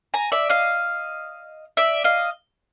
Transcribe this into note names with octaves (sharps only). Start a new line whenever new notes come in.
G#5 A#5
D5 E5
D#5 F5
D5 E5
D#5 F5